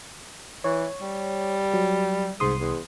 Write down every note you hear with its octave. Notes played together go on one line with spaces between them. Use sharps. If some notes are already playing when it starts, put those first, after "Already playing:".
E3 C#5
G3
F#3
C2 G#2 C6 D#6
E2